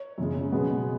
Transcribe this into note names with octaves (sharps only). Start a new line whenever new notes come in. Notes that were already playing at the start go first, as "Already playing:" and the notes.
Already playing: C#5
F#2 C#3 G#3
B2 G#3 B3